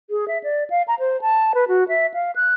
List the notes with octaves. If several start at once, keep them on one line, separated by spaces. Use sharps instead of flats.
G#4
E5
D5
F5
A#5
C5
A5
B4
F#4
E5
F5
F#6